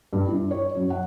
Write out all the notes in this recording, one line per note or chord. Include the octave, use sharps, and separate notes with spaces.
G2
E4
C#5
F#2
F#5